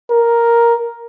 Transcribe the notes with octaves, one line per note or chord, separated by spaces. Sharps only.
A#4